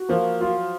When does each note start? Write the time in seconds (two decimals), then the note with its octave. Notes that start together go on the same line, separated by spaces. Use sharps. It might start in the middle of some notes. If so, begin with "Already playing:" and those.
Already playing: F#4
0.09 F3 A#3
0.40 F#3 F4